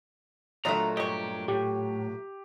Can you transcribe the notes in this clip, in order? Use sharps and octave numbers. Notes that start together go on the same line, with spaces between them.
A#2 F#3 A3 D4 D#5 A#5
G2 G4 D#5 C#6
A2 G4